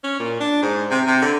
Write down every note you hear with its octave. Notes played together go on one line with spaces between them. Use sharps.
C#4
A#2
D4
G#2
C3
C3
D3